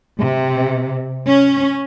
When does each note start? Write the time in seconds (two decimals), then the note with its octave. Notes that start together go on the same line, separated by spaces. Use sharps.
0.19 C3
1.26 C#4